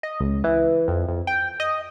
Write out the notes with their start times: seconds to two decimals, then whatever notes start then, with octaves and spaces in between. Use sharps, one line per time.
0.03 D#5
0.20 C#2
0.44 E3
0.88 F2
1.08 F2
1.27 G5
1.60 D#5